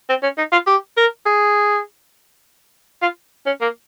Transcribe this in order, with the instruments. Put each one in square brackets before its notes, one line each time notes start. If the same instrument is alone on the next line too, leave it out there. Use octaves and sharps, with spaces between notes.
[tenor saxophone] C4
C#4
D#4
F4
G4
A#4
G#4
F4
C#4
A#3